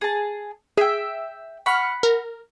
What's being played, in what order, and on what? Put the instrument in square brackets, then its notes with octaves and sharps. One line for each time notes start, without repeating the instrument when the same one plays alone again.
[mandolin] G#4 A5
[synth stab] G#4 [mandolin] E5 G5
[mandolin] F#5 B5 [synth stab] C#6 F6
[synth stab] A#4